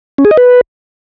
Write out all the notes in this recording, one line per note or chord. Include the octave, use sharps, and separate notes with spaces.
C#4
G#4
D#5
B4